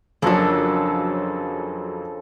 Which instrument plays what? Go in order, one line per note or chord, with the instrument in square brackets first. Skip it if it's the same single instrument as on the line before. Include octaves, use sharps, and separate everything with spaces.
[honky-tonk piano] F2 F#3 [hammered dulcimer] C#3 F3 A4 [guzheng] A#3 D4